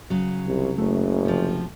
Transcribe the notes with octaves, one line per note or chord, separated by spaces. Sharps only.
C#3 F#3
C2
F#1 A3
C3 F3